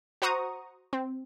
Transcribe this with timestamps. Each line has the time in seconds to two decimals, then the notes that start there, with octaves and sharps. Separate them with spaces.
0.22 F#4 C5 F#5 A#5 C#6 D#6
0.93 C4